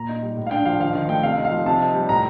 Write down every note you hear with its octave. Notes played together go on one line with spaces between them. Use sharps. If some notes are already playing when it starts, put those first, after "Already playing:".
Already playing: A#2 A#5
D#4
G3
A2
F5
D4 G5
F3 F5
D#3 F5
D#3
A3 G5
C3 F5
D#4
F5
F3
C3 A5
D#4
G3
A2 A#5